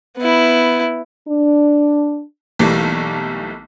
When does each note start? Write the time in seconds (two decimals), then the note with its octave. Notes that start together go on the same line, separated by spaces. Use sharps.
0.18 B3 E4
1.29 D4
2.59 B1 E3 G3 A3 A#3